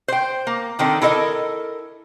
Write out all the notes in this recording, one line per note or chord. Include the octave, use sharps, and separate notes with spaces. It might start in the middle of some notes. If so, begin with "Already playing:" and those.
C5 G5
A#3
D3 D#3 C4 A4
E4 A4 A#4 D#5